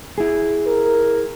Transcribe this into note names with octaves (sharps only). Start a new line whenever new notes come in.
E4 G#4
A#4